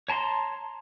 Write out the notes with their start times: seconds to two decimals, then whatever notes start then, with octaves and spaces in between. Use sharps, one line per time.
0.08 C#5 A5 A#5 C6